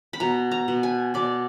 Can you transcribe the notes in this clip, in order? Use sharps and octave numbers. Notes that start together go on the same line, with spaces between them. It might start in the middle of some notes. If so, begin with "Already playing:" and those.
B5
B2 A#5
A#5
B2
G#5
B2 D5